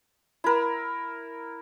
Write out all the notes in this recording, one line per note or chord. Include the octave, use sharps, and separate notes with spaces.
E4 A#4